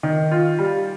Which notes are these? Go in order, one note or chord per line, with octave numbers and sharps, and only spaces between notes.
D#3
F4
G3